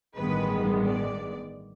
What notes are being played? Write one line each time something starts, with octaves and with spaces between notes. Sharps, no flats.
A1 G2 D#3 G#3 B3 B4
D5